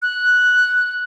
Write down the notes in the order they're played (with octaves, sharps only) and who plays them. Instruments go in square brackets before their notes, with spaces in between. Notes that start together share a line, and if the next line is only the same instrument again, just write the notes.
[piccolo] F#6